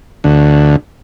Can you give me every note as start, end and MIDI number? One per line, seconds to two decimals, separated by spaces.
0.24 0.76 38